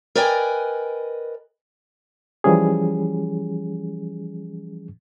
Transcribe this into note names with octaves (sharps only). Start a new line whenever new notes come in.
A#4 B4 D5 D#5 G5 G#5
E3 F3 G3 C#4 G#4